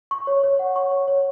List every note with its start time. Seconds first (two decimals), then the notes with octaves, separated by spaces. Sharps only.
0.11 C#6
0.27 C#5
0.44 C#5
0.59 F#5
0.76 C#6
0.91 C#5
1.08 C#5